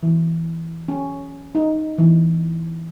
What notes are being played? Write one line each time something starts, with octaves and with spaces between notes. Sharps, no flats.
E3
C#4
D#4
E3